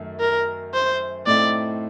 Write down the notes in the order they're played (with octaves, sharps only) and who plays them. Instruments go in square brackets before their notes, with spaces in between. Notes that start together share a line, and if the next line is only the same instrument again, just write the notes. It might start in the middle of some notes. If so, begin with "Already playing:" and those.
Already playing: [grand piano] F#2 D#3 A3
[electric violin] A#4
C5
[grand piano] A2 A3 C4 D#4 [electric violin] D5